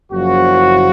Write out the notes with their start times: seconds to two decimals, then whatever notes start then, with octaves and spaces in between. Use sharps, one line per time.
0.12 F#1 F#2 F3 F#4